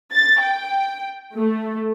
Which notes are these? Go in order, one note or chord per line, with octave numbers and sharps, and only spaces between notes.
A6
G5
A3